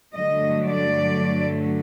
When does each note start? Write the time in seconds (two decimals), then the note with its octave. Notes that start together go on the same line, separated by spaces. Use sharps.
0.15 G2 D3 F#3 A3 D#5
0.67 D5